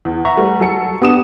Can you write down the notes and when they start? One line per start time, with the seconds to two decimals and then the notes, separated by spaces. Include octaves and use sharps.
0.05 E2
0.25 E5 F#5 A#5 C#6
0.36 G3 A3 B4
0.60 F#3 A4 C#7
1.02 B3 D4 G4 D#6 E7